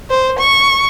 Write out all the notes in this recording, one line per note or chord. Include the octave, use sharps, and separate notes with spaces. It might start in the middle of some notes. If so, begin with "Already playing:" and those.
C5
C#6